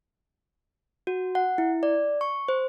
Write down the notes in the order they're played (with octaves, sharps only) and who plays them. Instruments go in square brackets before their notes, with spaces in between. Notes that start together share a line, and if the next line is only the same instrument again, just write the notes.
[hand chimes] F#4
F#5
E4
D5
C#6
C5